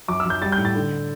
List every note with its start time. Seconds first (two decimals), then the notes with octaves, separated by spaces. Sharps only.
0.08 F#2 D6
0.20 E6
0.25 F#2 G6
0.42 G3 A6
0.52 G6
0.58 A2
0.65 A6
0.75 D3